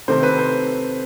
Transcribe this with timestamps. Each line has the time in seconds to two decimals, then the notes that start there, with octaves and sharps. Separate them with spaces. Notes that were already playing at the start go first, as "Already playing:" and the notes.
0.08 C3 D#3 A3 C4 C5
0.23 B4
0.39 C5